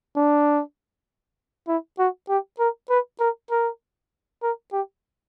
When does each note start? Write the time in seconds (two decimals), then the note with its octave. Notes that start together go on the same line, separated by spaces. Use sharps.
0.16 D4
1.68 E4
1.99 F#4
2.29 G4
2.59 A#4
2.90 B4
3.20 A#4
3.50 A#4
4.42 A#4
4.72 G4